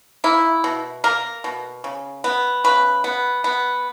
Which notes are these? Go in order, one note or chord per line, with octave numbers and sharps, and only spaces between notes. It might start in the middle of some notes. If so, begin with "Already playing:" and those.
A#3 E4
B2
A#3 A#4
B2
C#3
B3
C#3 B4
B3
B3